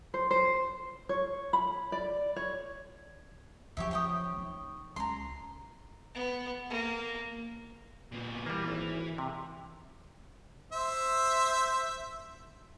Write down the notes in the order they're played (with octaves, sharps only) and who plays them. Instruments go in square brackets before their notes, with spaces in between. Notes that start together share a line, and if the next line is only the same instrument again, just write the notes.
[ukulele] C5
C5
C#5
B5
D5
C#5
[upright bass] C#3 F3 [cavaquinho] G4 C#5 E5
[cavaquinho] C#5 G5 D#6
[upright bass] D#4
[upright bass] C#2 [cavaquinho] A#5 C6
[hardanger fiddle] B3
A#3
[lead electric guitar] A#2 B3
[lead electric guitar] E3 [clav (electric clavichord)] G3 A#3
[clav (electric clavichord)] G#1
C3
[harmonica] C5 E5